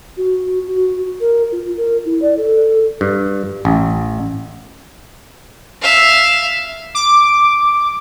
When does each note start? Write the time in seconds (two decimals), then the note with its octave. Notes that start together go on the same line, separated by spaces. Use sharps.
0.17 F#4
0.68 F#4
1.20 A#4
1.52 F4
1.77 A#4
2.05 E4
2.22 D5
2.37 A4
3.01 G2
3.65 A1
5.82 E5 F5
6.95 D6